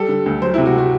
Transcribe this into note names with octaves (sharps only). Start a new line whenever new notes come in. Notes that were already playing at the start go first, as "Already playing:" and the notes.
Already playing: G3 A4
D3
D2
F#3 C5
E4
C3
F#4
F#4